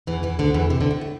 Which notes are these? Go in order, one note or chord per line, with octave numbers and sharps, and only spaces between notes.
E2 E3
E2 E3
D2 D3
E2 E3
C3
D2 D3
A2
A2